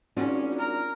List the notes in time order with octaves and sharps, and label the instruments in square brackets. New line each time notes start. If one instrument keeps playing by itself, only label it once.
[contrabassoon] G#1 [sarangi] C#4 [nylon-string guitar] D4 F4 F#4
[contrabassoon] G#1 [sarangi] A#4 [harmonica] A#5 F6